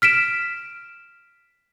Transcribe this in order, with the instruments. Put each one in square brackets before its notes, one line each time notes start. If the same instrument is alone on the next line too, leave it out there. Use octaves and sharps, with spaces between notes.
[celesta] F6 B6 D7 E7